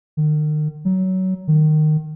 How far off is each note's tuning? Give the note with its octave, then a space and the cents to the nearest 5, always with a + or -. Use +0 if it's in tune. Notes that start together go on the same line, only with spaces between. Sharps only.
D#3 -40
F#3 +20
D#3 -20